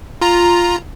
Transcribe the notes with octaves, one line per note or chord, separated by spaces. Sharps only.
F4 A#5